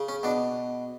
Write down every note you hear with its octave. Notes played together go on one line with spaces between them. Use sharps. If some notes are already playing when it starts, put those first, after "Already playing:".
Already playing: C#3
C#4
B2 D4